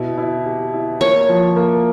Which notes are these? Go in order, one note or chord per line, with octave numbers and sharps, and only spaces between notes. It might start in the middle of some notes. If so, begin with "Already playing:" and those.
Already playing: B2 E4
E4
G4
E4
A#3 C#5
F3
A#3